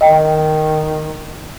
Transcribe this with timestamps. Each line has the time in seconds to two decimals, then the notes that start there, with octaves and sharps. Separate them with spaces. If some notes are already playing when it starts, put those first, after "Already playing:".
0.01 D#3 D#5 G5